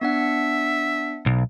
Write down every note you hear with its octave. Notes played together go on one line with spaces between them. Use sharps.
B3 D4 E5 F#5
B1